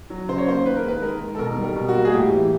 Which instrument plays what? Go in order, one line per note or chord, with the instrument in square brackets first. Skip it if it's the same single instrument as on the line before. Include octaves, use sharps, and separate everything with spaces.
[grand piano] F#3
C#3 C5
C#5
A#3 C5
D#3 B4
A#4
G#3 B4
G#3 A#4
D#3
A4
B2 A#4
G3
A#4
B2
F#4
A#3
G#4
A2 G4
E3